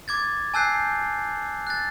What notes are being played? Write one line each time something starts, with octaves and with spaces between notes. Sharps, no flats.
D6 G#6 A6
G#5 A5 E6 F#6 G6 C7
F#6 A6